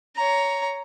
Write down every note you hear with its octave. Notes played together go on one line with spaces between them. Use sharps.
C#5 A#5